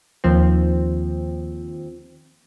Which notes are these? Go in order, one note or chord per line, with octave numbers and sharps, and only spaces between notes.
D#2 F3 C4